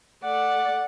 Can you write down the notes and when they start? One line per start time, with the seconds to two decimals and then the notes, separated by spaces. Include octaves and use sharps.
0.24 A3 D5 F#5